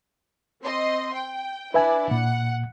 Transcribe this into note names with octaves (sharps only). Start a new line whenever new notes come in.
C4 D#5 C6
G5
D4 E4 B4 D5 E5 G#5
A#2 F#5